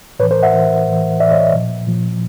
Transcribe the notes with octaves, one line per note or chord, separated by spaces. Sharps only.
A2 E3 B4 C#5
A#4 C5
E5 F#5
A2 E3
A2 E3
A2 E3 D5 E5
C#5 D#5
A#2 F3
A#2 F3